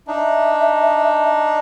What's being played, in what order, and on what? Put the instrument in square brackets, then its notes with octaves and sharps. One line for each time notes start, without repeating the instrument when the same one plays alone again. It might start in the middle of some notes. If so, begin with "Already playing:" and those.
[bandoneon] D4 D#4 [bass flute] E5